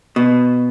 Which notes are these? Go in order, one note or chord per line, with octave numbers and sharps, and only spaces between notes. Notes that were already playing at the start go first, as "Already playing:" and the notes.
B2